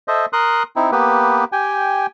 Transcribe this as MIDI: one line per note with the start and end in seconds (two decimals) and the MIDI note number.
0.08 0.26 69
0.08 0.26 72
0.08 0.26 75
0.08 0.26 76
0.33 0.63 70
0.33 0.63 84
0.33 0.63 87
0.33 0.63 90
0.76 0.91 60
0.76 0.91 63
0.76 0.91 64
0.92 1.45 58
0.92 1.45 59
0.92 1.45 67
0.92 1.45 71
1.52 2.06 67
1.52 2.06 79
1.52 2.06 80